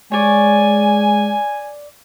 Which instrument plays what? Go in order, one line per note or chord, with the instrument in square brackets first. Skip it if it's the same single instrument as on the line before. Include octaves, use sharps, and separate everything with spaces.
[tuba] G#3 [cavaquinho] C#5 D5 [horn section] G#5